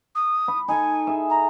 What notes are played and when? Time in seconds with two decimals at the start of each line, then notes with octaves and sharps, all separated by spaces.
0.15 D#6
0.48 B5
0.68 D#4 A4 G#5
1.07 G#4 E5
1.30 A#5